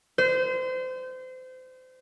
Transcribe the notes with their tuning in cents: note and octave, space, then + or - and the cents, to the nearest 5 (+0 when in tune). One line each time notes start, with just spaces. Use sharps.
C5 -30